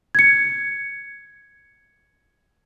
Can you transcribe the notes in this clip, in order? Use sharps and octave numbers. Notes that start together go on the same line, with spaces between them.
G#6 C#7